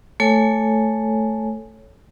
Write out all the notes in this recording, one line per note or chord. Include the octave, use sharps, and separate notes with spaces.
A3 A4 C#5 G#5